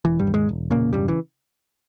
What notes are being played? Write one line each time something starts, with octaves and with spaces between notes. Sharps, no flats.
E1 E3
G2 G3
D#2
G#2 G#3
E1
A#2 C#3 A#3
E1 G2 G3
E3